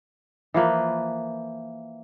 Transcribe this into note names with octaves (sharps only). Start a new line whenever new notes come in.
E3 F3 A#3 B4